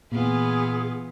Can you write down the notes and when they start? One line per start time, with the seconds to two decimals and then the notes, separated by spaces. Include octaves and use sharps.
0.12 A#2 E3 B3 F4 G#4